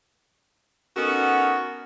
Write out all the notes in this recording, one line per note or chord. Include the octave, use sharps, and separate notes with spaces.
B3 C#4 D#4 F#4 A4 A#4